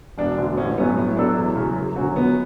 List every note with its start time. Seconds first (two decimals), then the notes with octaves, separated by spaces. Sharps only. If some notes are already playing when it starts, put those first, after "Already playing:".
0.18 E1 D4
0.38 D2 D3
0.57 A1 C#4
0.77 G2 F#3 A3 B3 C#4
0.97 A2 B3
1.17 F#3 B3 D4 E4 A4
1.37 E2
1.56 C#3 F#3
1.76 F#2
1.96 D3 F#3 C#4 F#4
2.16 C#2 B3